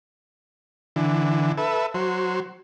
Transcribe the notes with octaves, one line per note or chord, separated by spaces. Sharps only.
D3 E3
A4 B4 E5
F#3 C5